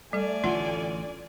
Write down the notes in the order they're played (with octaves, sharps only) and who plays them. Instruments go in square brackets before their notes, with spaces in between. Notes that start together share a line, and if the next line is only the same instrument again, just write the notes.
[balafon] G3 A4 [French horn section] A3 [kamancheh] D5 G#5
[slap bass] A1 D3 [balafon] F4 F#5